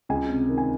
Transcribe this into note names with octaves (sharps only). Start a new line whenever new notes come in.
C#2 G#5
C3
D#3
G#5